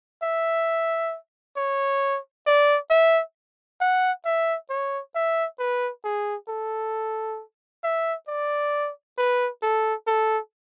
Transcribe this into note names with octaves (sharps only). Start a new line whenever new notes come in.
E5
C#5
D5
E5
F#5
E5
C#5
E5
B4
G#4
A4
E5
D5
B4
A4
A4